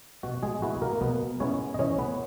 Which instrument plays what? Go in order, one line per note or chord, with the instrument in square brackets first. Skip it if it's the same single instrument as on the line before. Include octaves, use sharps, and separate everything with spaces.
[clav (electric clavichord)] B2 F#4
G#3 G#4
G#3 B3 E4 F#4
A#3 A#4
B2 B3 B4
G#3 B3 C#4 E4 C#5
D#5
E3 C#4 C#5
B3 B4